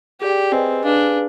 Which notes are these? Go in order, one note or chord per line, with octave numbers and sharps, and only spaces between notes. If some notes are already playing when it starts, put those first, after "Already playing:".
G4 G#4 D5 G5
C4 G#4 B4 D#5 G#5
D4 G#4 B4 F5 G#5